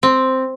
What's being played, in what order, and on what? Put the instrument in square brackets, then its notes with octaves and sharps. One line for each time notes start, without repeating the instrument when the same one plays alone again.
[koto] C4